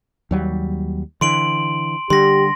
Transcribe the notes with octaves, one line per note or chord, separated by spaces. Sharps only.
D#2 F#3 G3
D3 E3 C6 D7 F#7
D3 G3 G4 C6 A#6